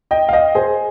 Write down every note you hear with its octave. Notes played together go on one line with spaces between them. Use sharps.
D#5 G5
F5
D#5 G5
G#4 C5